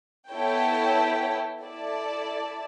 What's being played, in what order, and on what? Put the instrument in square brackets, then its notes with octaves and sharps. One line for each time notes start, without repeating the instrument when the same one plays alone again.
[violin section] B3 E4 A4 C#5 G5
E4 A4 D5 A5